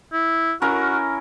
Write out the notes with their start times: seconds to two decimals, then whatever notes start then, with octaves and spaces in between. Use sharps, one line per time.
0.13 E4
0.62 C#4 E4 F#4 A#4